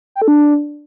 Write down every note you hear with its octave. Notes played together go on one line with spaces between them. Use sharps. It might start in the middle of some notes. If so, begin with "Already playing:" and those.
G5
A4
D4